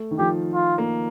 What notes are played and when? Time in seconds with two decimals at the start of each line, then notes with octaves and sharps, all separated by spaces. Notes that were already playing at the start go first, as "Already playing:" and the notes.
Already playing: A3
0.11 D#3
0.19 F3 G4
0.54 F4
0.78 A#3